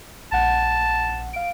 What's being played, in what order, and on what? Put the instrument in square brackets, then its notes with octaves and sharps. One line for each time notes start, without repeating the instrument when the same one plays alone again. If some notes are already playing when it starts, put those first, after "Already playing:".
[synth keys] A#1 F#5 [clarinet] A5
[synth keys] F5 D7